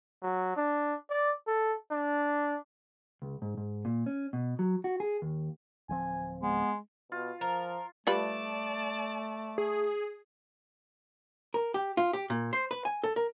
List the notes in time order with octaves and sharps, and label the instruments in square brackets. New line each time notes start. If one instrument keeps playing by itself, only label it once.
[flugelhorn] F#3
D4
D5
A4
D4
[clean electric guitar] C#2
G#2
G#2
A#2
C#4
B2
F#3
F#4
G#4
D#2
[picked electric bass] D1 F3 C4 [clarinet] G#5
[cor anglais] G#3 [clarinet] B3
[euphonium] B2 [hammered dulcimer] F4
[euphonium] F3 [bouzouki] A#4
[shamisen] G3 F4 B4 [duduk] A3 [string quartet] D5 A5
[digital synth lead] G#4
[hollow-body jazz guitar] A#4
G4
F4
G4
A#2
C5
B4
G#5
A4
A#4